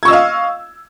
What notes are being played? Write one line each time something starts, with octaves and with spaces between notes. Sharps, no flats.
D#5 F5 C#6 E6 G#6